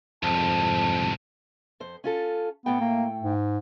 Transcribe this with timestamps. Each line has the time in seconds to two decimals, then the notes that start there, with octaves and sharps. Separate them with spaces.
0.23 C2 F2 G#2 A5
1.80 F2 C5
2.04 C#4 F4 A4
2.66 A2 A3 B3 G5
2.81 A#3
3.22 G#2